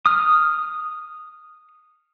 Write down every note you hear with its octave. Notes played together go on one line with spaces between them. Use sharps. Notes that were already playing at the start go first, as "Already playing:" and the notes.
D#6 F6